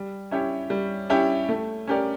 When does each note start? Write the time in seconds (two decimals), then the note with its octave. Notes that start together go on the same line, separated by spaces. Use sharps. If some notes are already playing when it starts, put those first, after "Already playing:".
Already playing: G3
0.31 C#4 E4 G4 C#5
0.70 G3
1.10 C#4 E4 G4 C#5
1.49 A3
1.87 C#4 G4 A#4 D5